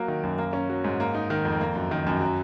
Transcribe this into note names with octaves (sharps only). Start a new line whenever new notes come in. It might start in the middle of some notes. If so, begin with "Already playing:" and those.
Already playing: F#3 A#3
D#3
F#2
A#3
C#4
F#3
G#2
A#3
D#4
D#3
F2
A#3
F#2
D#3
F#2
F#3